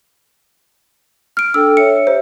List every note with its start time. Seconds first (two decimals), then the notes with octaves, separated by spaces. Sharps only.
1.37 F6 D7
1.54 D4 A4 G5 E6
1.77 C#5 E5 C#7
2.07 G4 C5 E5